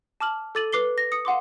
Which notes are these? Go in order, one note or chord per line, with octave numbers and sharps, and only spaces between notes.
A5 D6 F6 F#7
A4 D6 A6 D#7 F#7
B4 D6 C7 G7
A#6
D#6 C#7
F5 F#5 C6 D6